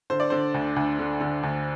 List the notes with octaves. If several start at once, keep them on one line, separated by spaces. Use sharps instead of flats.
D3 C5
D5
D3 C5
D2
D2
D3
D3
D2